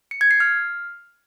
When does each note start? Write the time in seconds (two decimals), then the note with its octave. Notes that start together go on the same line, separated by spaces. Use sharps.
0.11 C#7
0.21 G#6
0.31 C7
0.40 F6